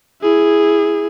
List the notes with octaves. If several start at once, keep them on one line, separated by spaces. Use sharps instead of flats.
E4 G#4